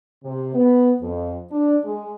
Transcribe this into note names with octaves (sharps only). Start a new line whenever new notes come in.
C3
B3
F2
D4
G#3